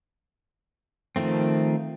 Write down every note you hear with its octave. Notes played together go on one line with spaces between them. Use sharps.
D#3 F3 A3 C4